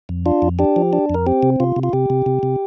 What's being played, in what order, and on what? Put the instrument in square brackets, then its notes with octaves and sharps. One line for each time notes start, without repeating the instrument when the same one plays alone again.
[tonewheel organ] F2
D4 F4
F2
D4 G4
F3
D4
F2 A#4
C4 G4
C3
C3 F4
C3
F4
C3 G4
C3
C3
C3